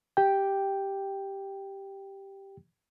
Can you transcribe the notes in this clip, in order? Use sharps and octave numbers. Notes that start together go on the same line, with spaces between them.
G4 G5